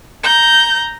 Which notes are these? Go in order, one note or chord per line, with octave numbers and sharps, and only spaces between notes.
A#5 G6